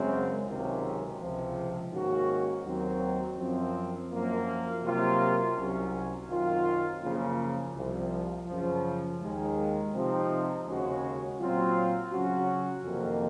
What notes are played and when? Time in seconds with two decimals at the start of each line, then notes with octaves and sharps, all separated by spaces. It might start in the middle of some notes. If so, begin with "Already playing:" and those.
Already playing: F#2 C#3 G#3 C4
0.45 C#2 C3 D#3 F#3 C#4
1.19 C#2 C3 F3
1.91 G#2 D#3 A#3 C#4 F#4
2.64 D#2 D#3 F#3 C4
3.37 F#2 F3 C4
4.10 F#2 F3 A#3
4.84 C3 F#3 A#3 F4
5.55 C2 C3 F#3 C#4
6.29 F#2 D#3 F#3 C4 F4
7.02 F#2 C#3 F3 A#3
7.75 C2 C3 F3
8.47 F#2 C#3 F3
9.20 D#2 D#3 G#3
9.93 C3 F3 C4 D#4
10.66 D#2 C#3 G#3 C#4 F#4
11.40 A#2 F#3 C4 F4
12.12 C#3 F#3 C#4 F#4
12.85 F2 C3 D#3 A#3